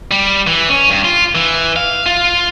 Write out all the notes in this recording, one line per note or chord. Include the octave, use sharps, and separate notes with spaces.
G3
E3
C#4
G2
F4
E3
F5
F4